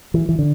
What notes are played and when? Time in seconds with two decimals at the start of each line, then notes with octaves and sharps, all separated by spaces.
0.14 E3
0.29 E3
0.39 D3